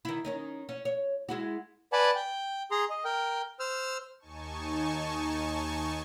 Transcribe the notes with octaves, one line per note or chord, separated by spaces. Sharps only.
D#3 E4
D#3 C#4 D#4
C#4
C#5
G#3 E4 F#4
B4 D5 F#5 G#5 A5 B5
G5
G#4 A#5 C6
D#5
A#4 G5
C5 E6 F6
D#2 D#4 G#5 A5 C#6